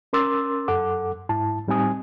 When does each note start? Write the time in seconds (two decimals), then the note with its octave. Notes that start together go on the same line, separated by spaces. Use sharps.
0.13 C#4 A#4 C6 D6 E6 A6
0.68 F#2 A4 F#5 D6
1.29 G#2 E4 A5
1.68 A2 G3 C4 D#4 G#5 D#6